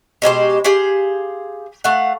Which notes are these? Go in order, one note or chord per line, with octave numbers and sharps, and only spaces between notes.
B2 G#3 G4 C5
G4 G#4 C5 F5
A3 F5 F#5